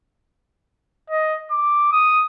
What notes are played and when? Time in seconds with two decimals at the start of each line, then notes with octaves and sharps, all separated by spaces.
1.10 D#5
1.51 D6
1.92 D#6